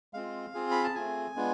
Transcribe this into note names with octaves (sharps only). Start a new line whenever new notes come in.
G#3 C4 F4 F5
C4 F4 G#4
B5
A5
A3 C4 F4 G#4 G#5
G#3 B3 D4 F4